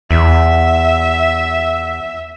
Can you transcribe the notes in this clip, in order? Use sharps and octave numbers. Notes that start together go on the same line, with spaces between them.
E2 E5